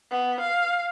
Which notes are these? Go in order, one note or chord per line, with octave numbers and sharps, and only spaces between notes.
B3
F5